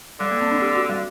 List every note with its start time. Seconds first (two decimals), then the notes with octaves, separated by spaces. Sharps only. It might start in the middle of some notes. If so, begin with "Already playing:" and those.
0.20 D3 G3
0.31 A#3
0.41 C4
0.52 D4
0.62 G4
0.76 F#4
0.89 G3